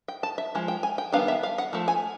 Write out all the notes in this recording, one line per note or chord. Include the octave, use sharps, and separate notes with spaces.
G5
A5
E5
F3 G#3
G5
G#5
G5
D#3 G3 B3 D4 F5
E5
F5
F#5
F3 A3
G#5